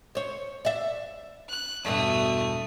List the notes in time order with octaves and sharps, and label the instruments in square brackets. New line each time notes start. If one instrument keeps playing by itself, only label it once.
[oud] C5 C#5
D5 E5
[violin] F#6
[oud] E2 G2 B2 [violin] A3 D#6